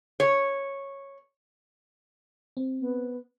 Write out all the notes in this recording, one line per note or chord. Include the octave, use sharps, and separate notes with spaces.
C#5
C4
B3